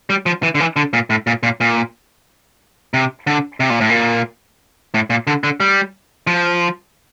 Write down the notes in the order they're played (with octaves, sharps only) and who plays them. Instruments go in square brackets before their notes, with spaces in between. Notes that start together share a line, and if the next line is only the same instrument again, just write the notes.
[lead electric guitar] G3
F3
E3
D3
E3
D3
A#2
A2
A#2
A#2
A#2
C3
D3
C3
A#2
A2
A#2
A2
A#2
D3
D3
G3
F3